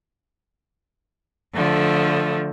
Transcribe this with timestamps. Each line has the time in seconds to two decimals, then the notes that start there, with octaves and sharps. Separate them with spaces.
1.54 D3 F3 A3